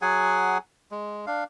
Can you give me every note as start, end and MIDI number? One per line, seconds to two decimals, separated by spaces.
0.02 0.58 54
0.02 0.58 68
0.02 0.58 78
0.02 0.58 80
0.91 1.25 56
1.27 1.44 62
1.27 1.44 77